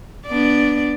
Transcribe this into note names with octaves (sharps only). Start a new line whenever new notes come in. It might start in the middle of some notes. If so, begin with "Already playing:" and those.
B3 D4 D5